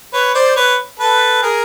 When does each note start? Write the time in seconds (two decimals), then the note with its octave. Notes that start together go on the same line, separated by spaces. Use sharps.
0.13 B4 C#5
0.35 C5 D5
0.56 B4 C#5
0.99 A4 B4
1.42 G#4 A#4